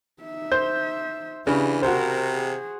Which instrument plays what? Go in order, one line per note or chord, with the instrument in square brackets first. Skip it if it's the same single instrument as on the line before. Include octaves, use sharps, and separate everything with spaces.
[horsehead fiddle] D#4 E5
[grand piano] C5 [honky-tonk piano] G6
[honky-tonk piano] C#3 [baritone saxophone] E3 [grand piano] D4 [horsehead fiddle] G4
[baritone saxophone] C3 [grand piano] F#4 C5 [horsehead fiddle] A#4
[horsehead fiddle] G#4